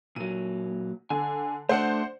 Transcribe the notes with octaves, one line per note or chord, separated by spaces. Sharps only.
A#2 F#3 D#7
D3 G#5
A3 D4 C5 D5 F#5